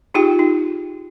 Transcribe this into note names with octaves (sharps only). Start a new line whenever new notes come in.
D#4 F4 G4 G#4 G5
D#4